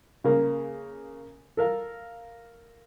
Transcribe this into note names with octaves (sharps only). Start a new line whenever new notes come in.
C#3 A#3
A4 A#4 F5